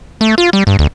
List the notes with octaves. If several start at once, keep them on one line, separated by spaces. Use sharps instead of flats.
A3
F4
G3
G2
D2